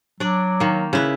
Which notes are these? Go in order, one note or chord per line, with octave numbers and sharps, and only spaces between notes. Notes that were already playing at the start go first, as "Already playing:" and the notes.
F#3 D4 D5
D#3 A#3
C#3 E4 B4